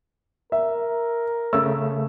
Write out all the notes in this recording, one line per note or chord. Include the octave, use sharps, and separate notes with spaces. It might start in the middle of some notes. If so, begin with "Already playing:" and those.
A#4 E5
C#3 A3 E6